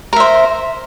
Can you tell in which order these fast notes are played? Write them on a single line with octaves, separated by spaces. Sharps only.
A#4 E5 C5